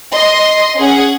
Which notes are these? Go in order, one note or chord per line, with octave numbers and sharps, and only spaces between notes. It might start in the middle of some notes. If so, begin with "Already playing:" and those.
D#5 C6
C#4 G#4 F#5